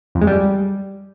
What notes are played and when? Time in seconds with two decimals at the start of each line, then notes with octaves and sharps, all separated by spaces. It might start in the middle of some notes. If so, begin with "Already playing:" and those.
0.15 F2
0.21 G#3
0.27 G3